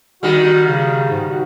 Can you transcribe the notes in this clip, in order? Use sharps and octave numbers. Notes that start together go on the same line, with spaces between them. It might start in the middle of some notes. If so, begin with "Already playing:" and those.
D#3 G3 F#4
C#3
G#2
F#4